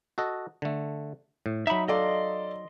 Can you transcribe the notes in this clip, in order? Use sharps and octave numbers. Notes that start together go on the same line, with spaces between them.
F#4 A4 D#5
D3 A3
A2
F#3 D#4 E5 B5
A4 D5 D#5 F5 C6